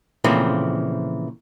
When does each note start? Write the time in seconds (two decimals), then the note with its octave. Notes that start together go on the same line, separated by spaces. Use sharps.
0.24 A#2 C#3 E3 F3 A3 C4